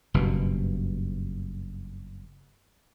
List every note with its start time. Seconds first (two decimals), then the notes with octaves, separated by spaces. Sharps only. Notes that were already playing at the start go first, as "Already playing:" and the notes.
0.14 F#1 G2 B2